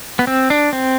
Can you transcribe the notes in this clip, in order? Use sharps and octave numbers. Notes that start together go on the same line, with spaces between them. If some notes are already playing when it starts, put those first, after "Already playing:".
B3
C4
D4
C4